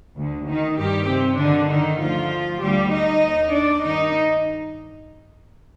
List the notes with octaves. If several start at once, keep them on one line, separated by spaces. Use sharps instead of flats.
D2 D3
D#3 D#4
G2 D#3 G3 G4
C3 C4
G2 D3 D#3 D4
D#3 D#4
D2 D3 F3 F4
D2 D3 G3 G4
D#4 D#5
D#2 D#3
D4 D5
G2 D#3 D#4 D#5